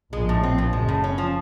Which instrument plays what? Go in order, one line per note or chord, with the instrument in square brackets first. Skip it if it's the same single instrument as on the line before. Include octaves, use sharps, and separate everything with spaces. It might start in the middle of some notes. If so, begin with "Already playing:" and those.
[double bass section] A#1 A#2 [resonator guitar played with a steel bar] G#3
[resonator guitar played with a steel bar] A2
[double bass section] A#1 A#2 [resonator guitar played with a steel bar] C4
[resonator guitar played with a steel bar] F3
[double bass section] F#1 F#2 [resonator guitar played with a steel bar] G#3
[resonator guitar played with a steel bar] A2
C#4
F3